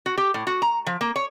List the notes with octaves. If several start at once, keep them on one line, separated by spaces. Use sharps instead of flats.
F#4
G4
A2
F#4
A#5
F3
A#3
C#5